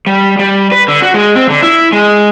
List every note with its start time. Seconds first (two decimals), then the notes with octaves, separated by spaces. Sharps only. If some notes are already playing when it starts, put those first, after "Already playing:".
0.07 G3
0.39 G3
0.72 B4
0.88 D3
1.02 F#4
1.14 G#3
1.35 C4
1.50 D3
1.62 E4
1.92 G#3